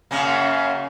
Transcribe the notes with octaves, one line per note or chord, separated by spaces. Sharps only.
F#2 C#3 A#3